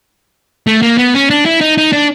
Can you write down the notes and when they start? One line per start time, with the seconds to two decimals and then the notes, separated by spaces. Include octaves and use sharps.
0.67 A3
0.82 A#3
0.98 B3
1.14 C#4
1.30 D4
1.46 E4
1.61 D#4
1.78 D#4
1.92 D4